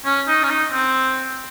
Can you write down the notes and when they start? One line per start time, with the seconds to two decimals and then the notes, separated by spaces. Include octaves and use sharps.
0.05 C#4
0.28 D#4
0.43 C#4
0.49 D#4
0.72 C4